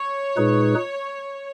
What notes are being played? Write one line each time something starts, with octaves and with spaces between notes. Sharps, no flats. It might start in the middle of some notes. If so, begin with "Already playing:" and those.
Already playing: C#5
A#2 G#3 D#4 G#4 B4